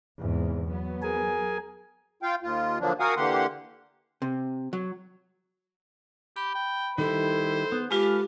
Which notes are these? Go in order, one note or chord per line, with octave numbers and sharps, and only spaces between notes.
E2 G#2 C3
F#3 B3
G#4 A#4 G#5
F4 F5 G5
D#2 F4
D3 F3 F#3 A#3 D4
F#4 A#4 F5 F#5 G#5 D#6
D3 E3 A#3 G4 F#5 C6
C3
F#3
G4 B5
G5
D#3 G3 E4 A4 C5
B3
G#3 F4 G4 A4 B4 F5